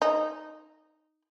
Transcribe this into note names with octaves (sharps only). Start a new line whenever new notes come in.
D#4